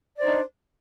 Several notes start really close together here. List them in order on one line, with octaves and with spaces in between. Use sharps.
D5 C5 D#4 D4